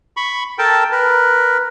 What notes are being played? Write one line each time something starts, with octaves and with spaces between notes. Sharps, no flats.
B5 C#6
A4 A#4 G5 A5
A#4 B4